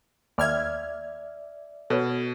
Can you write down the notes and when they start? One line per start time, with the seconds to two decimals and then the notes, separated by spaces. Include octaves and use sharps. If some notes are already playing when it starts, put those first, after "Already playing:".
0.38 D#2 D5 E5 F6 G#6
1.90 B2 A4 B4 C#5